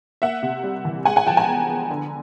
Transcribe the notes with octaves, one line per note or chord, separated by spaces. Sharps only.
A#3 E5 F#5
C3
G3
E3
G#3 F#5 G#5
F#5 G#5
F3 G5 A5
G#5 A#5
B3
B3
D3